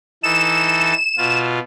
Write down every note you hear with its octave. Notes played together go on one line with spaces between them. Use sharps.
E3 D#4 A4 E7
B2 F4